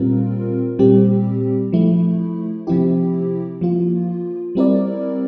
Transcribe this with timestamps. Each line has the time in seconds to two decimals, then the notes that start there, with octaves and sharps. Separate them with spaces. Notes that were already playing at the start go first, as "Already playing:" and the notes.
Already playing: A#2 G3 C4 F4 A#4
0.79 A#2 G3 C4 G4
1.72 F3 A3 E4
2.67 C3 F3 C4 E4 G4
3.61 F3 A#3 F4
4.55 G3 C4 E4 A#4 D5